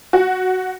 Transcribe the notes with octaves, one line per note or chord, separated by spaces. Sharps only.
F#4